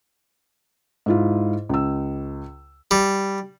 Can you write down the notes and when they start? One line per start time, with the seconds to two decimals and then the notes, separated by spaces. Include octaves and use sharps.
1.06 G#2 E4 F4
1.69 C#2 E6
2.91 G3